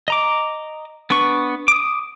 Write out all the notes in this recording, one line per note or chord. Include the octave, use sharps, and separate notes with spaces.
D#5 A#5 D6
B3 D4 B4 C#6
D6 D#6